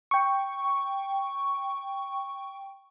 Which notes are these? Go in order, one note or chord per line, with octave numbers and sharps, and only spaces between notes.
G5 C#6